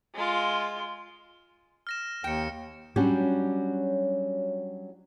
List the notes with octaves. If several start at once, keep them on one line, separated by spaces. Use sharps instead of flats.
G#3 F4
F6 A#6 E7
D#2 G5 C#7 E7
F#3 G3 C#4 D4 F#4 G4